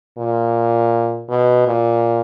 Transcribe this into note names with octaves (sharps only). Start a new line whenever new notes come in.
A#2
B2
A#2